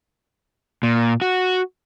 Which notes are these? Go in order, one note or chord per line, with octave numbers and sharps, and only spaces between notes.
A#2
F#4